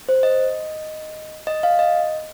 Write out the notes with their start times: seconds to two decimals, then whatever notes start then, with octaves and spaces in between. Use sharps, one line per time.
0.09 C5
0.23 D#5
1.47 D#5
1.63 F5
1.79 D#5